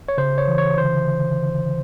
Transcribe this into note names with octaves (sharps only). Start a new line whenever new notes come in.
C#5
C#3 C5
C#5
E3
C#5
D3 C5